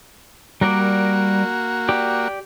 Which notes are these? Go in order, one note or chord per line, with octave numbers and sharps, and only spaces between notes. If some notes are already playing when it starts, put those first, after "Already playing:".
G3 A#3 F#4 A#4 D5
G4 D5